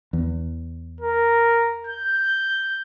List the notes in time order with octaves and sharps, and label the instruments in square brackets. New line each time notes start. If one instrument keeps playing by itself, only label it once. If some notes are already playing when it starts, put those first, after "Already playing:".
[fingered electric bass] E2
[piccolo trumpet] A#4
G6